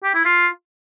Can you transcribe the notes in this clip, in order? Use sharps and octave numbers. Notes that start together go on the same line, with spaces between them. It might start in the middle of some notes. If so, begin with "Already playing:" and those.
G4
E4
F4